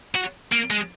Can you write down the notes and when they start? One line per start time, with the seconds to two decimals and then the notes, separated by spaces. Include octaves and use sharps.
0.15 F#4
0.52 A#3
0.71 G#3